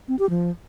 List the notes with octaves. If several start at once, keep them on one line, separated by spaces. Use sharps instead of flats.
C4
G4
F3